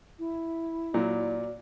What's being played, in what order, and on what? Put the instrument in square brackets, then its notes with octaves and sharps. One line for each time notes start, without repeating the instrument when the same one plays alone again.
[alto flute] E4
[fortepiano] A#2 F#3 [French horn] D5